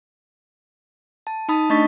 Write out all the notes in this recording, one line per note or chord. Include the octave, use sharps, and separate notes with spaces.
A5
D#4 A5 B5 D#6
A3 D4 D#5 C#6 A6 B6